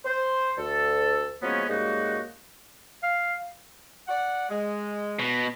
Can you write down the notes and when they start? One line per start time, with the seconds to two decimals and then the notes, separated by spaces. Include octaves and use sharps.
0.05 C5
0.58 D2 A4
1.42 F3 F#3 G#3 A#3 B3 C#4
1.69 F#2 G3 G#3 A#3 D#4 F#4
3.03 F5
4.08 D5 F#5
4.50 G#3
5.19 B2